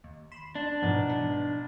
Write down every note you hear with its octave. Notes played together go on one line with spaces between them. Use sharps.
D#2
B5 C6 E7
D4
B1 G#2 E3 F3
B3